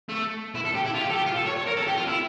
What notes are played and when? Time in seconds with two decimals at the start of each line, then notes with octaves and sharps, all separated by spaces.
0.09 A3
0.55 E4
0.65 A4
0.75 G4
0.85 E4
0.94 F4
1.00 G4
1.10 A4
1.15 G4
1.26 F4
1.36 A4
1.46 C#5
1.56 C#5
1.67 A#4
1.77 A4
1.87 G4
1.97 F4
2.07 E4